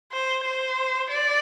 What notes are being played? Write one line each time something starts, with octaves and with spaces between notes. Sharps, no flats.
C5
C5
D5